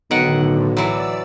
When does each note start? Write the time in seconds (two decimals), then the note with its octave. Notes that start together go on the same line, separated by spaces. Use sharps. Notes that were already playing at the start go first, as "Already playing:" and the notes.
0.11 B1 A2 D3 D#3 F#5
0.77 E3 F#3 D5 E6